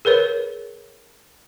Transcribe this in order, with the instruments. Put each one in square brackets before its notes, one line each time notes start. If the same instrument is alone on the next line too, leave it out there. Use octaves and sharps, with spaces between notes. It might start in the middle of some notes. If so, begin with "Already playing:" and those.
[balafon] G#4 A#4 B4 C#5